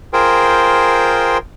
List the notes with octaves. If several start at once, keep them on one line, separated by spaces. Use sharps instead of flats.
F4 G#4 A#4 C5 G5